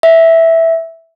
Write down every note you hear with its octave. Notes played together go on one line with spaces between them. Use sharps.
E5